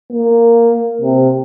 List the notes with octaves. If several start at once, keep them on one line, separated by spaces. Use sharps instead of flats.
A#3
C3